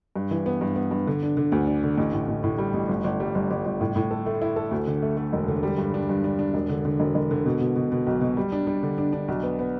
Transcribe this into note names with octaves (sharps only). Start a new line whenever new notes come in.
G2
E3
B3
G2
B3
G2
D3
D4
D3
D2
D4
D3
A1
A2
A1
A2
G3
A1
G1
G1
G3
G1
G1
G1
A2
A2
A4
A3
E4
A4
D2
D3
A3
A3
E1
D3
G3
G2
D4
G2
D4
D4
E1
D3
D3
E1
E1
D3
B2
B2
B2
B2
B1
B2
G3
D4
G3
D3
D4
D4
B1
B3
B3